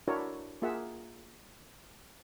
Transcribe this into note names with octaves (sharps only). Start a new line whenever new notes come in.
D4 E4 F#4 A#4 C#5
A#3 F4 G#4 E5 F#5